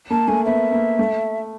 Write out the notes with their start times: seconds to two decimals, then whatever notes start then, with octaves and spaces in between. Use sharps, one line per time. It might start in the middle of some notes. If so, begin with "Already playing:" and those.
0.10 A#3 A5
0.28 A3 G#5
0.45 B3 E5
0.72 A#3
0.99 A3